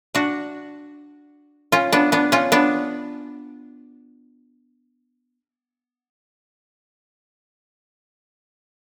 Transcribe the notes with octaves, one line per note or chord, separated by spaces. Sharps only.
D4 F#4
C#4 F4
B3 D4
B3 D4
C#4 F4
B3 D4